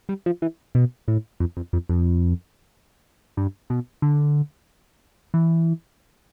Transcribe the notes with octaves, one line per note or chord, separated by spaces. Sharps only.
G3
F3
E3
B2
A2
F2
F2
F2
F2
G2
B2
D3
E3